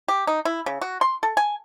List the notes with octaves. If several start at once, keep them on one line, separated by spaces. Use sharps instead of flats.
G4
D#4
E4
C#3
F#4
C6
A4
G#5